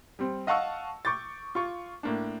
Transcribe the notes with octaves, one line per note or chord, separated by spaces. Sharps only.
G3 C4
D#5 F5 F#5 A5 C#6 E6
C#6 D6 G6 A6
F4 C#6
A2 A#3 D4